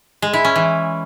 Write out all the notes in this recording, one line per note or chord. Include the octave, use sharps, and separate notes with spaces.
G#3
E4
C#4
E3